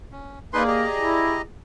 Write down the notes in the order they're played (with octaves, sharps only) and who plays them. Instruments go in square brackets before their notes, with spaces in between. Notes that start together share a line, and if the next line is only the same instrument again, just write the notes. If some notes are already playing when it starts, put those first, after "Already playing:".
[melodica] C#4
[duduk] A#3 [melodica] D#4 B4 C6 [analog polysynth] G#4 D5
[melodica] G4 D#5 A#5
[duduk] E4